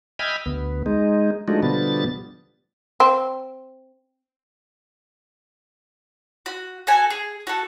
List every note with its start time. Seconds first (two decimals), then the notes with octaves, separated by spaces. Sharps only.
0.19 D#5 E5 G5 G#5 B5 F6
0.46 D2 B3
0.86 G#3 D#4
1.48 F3 G#3 A3 D4 D#4 F#4
1.63 B2 D3 F3 G3 B3 A6
3.00 C4
6.46 F#4
6.87 F#4 A4 G#5
7.10 G#4
7.47 F#4 A4